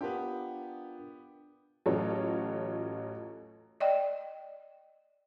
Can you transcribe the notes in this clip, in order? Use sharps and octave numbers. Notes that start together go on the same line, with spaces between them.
B3 D4 F4 G4 A#4
A1 F#3 F4 A4 C#5
D5 D#5 G5